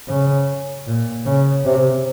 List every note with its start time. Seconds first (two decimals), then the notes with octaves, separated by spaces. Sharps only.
0.08 C#3
0.87 A#2
1.26 C#3
1.65 C3